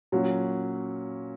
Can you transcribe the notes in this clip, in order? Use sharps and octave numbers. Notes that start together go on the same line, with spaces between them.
A#2 F#3 C#4